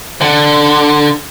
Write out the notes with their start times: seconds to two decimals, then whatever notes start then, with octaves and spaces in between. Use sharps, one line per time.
0.21 D3